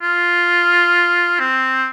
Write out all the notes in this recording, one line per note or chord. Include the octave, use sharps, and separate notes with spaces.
F4
C4